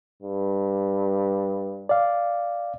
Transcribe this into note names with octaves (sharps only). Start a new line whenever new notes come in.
G2
D5 F5